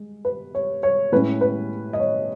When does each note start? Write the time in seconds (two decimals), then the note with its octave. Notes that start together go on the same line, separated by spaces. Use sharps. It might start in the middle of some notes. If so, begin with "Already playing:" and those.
Already playing: G#3
0.25 B4
0.55 C#5
0.83 C#5
1.12 A2 G#3 C#4 B4
1.41 B4
1.93 D#5
2.00 C#5